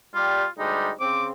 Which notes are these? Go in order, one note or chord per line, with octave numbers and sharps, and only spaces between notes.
G3 F4
D2 G3 G#3 D#4
C#3 C4 D6